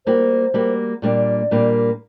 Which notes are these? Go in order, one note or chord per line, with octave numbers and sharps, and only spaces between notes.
G3 A#3 F#4 C5
G3 A#3 F#4
A#2 G3 A#3 D4 D5
A#2 G3 A#3 D4